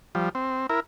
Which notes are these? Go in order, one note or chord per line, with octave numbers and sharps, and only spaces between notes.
F3 G3
C4
E4 A#4